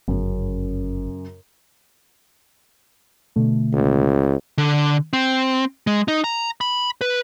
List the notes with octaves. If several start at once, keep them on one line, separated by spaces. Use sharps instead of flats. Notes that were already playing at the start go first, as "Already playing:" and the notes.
G1 F#2 C#3
B2 D3 A3
C#2
D3
C4
G#3
D#4
A#5
B5
B4